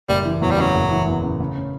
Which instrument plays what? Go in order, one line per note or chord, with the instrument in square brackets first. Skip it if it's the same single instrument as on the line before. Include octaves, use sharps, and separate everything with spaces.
[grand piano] F#1 [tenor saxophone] G3
[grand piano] E3
[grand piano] E2 [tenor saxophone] F#3
[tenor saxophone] G3
[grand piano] C#3 [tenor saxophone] F#3
[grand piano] F#1
E3
E2
C#3
C#3
C#4